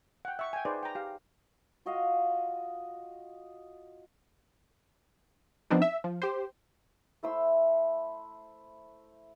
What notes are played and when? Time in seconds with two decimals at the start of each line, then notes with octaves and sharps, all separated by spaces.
0.25 F#5 G5
0.39 E5 C#6
0.53 G5 G#5
0.65 D#4 G#4 B4 C5 D5
0.83 G5 A#5
0.95 G4 F5
1.86 F4 F#4 D#5 F5
5.70 F3 B3 C4 D4 D#4
5.82 E5
6.04 F3
6.22 G4 C5
7.23 A3 E4 C5 E6